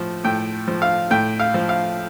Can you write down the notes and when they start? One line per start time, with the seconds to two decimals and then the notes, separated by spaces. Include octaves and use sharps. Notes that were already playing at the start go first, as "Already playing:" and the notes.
Already playing: A2 F3
0.24 A2 G5
0.68 F3
0.82 F5
1.11 A2 G5
1.40 F5
1.54 F3
1.69 F5